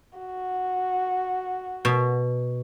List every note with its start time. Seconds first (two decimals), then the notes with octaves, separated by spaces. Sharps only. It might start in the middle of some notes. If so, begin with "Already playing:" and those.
0.19 F#4
1.85 B2